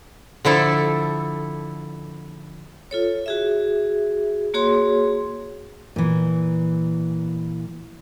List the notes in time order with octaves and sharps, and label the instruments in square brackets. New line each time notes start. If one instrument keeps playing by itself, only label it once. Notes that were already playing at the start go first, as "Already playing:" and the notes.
[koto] D3 F3 E4 A4
[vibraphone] F4 A4 C#5
F#4 G#4 E5
A#3 F#4 G#4 C#5 C6
[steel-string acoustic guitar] A#2 E3